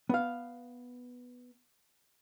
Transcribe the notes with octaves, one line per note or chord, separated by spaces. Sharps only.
B3 F5